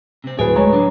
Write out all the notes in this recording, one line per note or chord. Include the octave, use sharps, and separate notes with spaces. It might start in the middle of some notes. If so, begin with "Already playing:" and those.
C3 C4
D1 G#4 B4 C#5 G5 G#5
G#3 A3 C#5 A#5
D3 F#3 D4